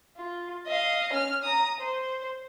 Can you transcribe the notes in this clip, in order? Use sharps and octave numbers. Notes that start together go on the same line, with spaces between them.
F4
D#5 F5
C#4 F6
A#5 D#6
C5